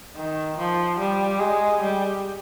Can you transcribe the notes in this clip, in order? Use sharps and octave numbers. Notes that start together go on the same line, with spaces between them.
D#3
F3
G3
G#3
G3